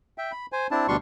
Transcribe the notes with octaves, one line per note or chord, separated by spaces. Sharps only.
E5 G5
B5
C5 G#5
C4 D4 E4 A5
D2 B2 G3 D4 C6 C#6